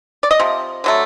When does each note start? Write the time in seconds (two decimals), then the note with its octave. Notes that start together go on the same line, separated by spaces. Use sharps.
0.23 D5
0.31 D#5
0.39 C3 F3
0.84 D3 F#3 A3